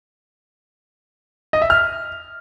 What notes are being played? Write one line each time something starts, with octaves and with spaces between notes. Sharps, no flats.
D#5
E5
F6